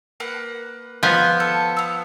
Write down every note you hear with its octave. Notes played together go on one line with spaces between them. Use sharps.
A#3 B4 F#5
F3 B3
A4
B3 E6